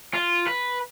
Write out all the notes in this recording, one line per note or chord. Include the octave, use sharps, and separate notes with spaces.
F4
B4